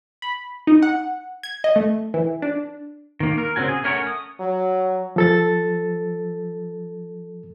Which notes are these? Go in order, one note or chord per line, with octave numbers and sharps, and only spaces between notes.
B5
D#4
F#5
G#6
D#5
A3
E3
D4
D#3 A#3
A#4
C#3 C4 C#4 F#4 G#5
G#4
A3 C#4 A#4 C#5 F#5
D#6
F#3
F3 A4 A6